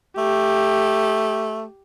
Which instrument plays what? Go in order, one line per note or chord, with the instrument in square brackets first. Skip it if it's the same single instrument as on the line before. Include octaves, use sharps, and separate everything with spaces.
[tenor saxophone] A3 [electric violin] G4